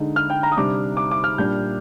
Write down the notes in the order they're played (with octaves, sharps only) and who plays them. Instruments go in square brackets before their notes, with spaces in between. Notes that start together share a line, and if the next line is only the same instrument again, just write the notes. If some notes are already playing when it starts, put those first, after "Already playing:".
Already playing: [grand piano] D3 G#3 D#4
F6
G5
A#5
D#6
C3 G3 D4 D6
D6
D6
F6
A#2 G3 D4 G6